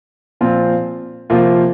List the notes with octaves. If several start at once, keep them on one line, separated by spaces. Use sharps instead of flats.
A#2 F3 C4 F4
C3 F3 A#3 F4